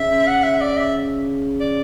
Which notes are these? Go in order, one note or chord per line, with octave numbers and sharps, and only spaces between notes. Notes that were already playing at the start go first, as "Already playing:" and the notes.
Already playing: C#3 E5
F#5
E5
D5
E5
D5